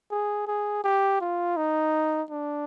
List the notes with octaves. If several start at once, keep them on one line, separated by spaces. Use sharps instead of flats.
G#4
G#4
G4
F4
D#4
D4